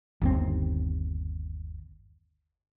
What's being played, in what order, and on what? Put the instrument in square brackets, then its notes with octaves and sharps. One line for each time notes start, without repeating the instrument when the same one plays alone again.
[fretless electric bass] G1 D#2 C4